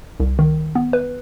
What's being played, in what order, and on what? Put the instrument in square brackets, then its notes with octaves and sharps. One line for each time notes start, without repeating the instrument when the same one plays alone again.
[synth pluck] C2
D#3
B3
B4